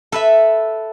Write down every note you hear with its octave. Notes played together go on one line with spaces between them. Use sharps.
A4 B4 E5